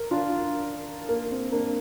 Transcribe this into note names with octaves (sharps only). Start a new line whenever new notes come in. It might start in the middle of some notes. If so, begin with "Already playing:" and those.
Already playing: A#4
D4 F4
A#3
C4
A#3 D4